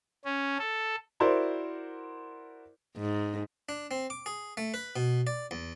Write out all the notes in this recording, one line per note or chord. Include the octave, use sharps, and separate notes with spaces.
C#4
A4
E4 F#4 A#4 C5 D5
G#2
D4
C4
D6
G#4
A3
B4
B2
D5
E2